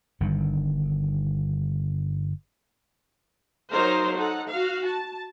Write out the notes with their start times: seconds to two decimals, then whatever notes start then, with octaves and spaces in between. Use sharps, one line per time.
0.20 G1 G2 D#3
3.71 F#3 D#4 A#4 C5 F5
4.16 D#4 A4 F#5
4.47 F#4 F5
4.86 A5